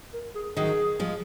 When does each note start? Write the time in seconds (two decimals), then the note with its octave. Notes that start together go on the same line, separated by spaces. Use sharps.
0.14 A#4
0.35 G#4
0.56 D#3 F#3 G#4
0.99 F3 G#3